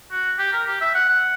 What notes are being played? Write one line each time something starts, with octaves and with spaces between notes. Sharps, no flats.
F#4
G4
A#4
G4
E5
F#5
F#5